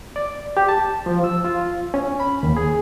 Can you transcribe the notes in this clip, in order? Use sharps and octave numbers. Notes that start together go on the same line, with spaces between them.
D5
G4
A5
F3
E6
F4
C#4
B5
D#2
G#4